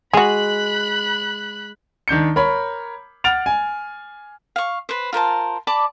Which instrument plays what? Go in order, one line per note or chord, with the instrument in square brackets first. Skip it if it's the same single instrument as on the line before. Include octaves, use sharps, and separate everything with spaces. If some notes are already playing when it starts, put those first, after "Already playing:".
[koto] G#3 [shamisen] F#4 G#4 [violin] B5 F#6
[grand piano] D#3 D4 G6 C#7
A#4 C#5 B5
F#5 F6 A6 D7 F7
G#5
[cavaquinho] F5 C#6
B4 C5
F4 A#4 C5 A5
D5 A5 B5 D6